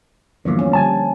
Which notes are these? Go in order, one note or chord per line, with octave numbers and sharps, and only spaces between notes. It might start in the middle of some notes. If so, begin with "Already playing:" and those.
E2 G2 D3 F3 A#3
C#4
D3 G3 G#5 A5